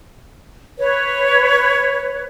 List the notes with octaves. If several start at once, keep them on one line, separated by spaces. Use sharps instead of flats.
B4 C#5